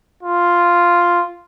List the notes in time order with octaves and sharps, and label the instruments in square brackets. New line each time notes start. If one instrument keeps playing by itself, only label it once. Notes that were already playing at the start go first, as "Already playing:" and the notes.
[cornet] F4